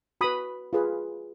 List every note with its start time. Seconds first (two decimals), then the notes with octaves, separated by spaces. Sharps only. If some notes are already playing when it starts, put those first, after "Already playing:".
0.21 F#4 B4 B5 D#6
0.73 F4 G#4 B4